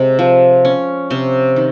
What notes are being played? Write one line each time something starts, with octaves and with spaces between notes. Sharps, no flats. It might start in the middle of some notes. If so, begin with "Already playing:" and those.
Already playing: C3 G#3
F3
C#4
C3 C6
D#3